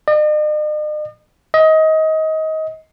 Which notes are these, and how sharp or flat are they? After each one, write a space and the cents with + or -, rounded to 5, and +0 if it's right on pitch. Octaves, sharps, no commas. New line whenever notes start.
D#5 -45
D#5 +25